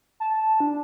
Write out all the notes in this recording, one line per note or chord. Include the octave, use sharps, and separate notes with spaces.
A5
D4